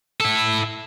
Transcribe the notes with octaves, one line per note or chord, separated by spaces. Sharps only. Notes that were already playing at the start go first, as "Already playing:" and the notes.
E4 A4